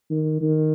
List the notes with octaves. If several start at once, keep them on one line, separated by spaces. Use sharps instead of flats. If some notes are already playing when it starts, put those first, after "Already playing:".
D#3
D#3